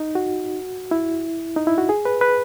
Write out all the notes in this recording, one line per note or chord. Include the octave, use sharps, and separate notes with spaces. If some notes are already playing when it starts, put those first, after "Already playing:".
Already playing: D#4
F#4
E4
D#4
E4
F#4
G#4
B4
B4